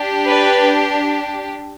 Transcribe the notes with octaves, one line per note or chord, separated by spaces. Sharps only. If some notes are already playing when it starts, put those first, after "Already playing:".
Already playing: D4 G4
B4 D5